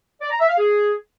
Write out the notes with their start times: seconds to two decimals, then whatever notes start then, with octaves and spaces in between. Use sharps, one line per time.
0.21 D5
0.30 A#5
0.40 E5
0.49 F5
0.58 G#4